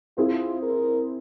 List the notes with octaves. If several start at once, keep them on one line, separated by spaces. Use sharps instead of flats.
C4 E4 F4 G#4
A#4